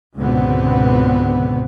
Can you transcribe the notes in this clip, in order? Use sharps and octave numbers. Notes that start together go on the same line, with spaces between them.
C#2 G#2 B2 D3 B3 C4